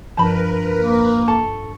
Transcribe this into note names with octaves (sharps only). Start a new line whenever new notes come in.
G2 F3 A#4 B4 A5 B5 G6
A#3
A4 A5 C#6